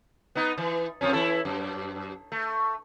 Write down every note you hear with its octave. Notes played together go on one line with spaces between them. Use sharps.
B3 D#4
E3
F2 F3 C#4
E3 E4 A4
F#2
A3